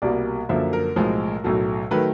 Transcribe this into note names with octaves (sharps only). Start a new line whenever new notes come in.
C2 B2 G3 A#3 D5
F#2 D3 F3 A#3 E5
A#4
B1 A2 F3 G#3
B1 A2 F#3 A3
D#3 F#3 A3 B4